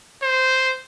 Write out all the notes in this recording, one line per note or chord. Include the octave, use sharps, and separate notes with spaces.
C5